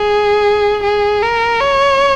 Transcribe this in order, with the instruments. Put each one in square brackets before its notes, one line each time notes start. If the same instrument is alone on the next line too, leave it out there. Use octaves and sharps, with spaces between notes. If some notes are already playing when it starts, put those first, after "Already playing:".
Already playing: [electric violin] G#4
G#4
A#4
C#5